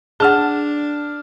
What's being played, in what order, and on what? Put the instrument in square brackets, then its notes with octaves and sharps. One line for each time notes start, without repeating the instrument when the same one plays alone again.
[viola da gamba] D4 [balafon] G#4 F#5 [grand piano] A5 F6